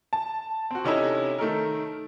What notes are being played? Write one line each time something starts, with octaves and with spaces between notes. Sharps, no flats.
A5
C4 F#4
C3 C#4 D#4 E4 A4
D#3 A3 A4 A#4